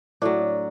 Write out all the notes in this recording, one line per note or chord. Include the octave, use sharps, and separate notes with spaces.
A2 F#3 D4